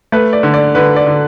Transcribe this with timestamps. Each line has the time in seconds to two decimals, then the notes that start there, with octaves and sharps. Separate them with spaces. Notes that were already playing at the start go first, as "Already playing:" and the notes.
0.12 A3 B4
0.33 D5
0.43 D3
0.54 D5
0.75 D3 B4
0.96 D5
1.06 D3